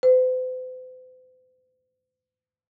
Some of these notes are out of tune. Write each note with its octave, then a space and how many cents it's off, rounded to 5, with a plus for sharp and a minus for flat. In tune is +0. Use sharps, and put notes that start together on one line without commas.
C5 -45